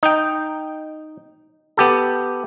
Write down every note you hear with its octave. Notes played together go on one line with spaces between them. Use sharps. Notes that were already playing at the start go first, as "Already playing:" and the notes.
D#4 G5
B3 G4 A4